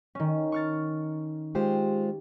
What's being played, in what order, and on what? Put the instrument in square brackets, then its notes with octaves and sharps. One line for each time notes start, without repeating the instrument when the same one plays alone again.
[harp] D#3 C#4
C#6 F6 A6
[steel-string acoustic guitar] G#3 F4 C5 [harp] G4